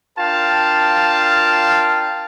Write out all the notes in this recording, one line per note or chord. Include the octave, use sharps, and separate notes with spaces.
D4 F4 A#4 F5 G5 A5